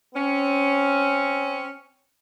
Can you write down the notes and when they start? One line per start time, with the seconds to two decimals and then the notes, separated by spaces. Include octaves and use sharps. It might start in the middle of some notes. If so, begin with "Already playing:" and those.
0.15 C4 C#4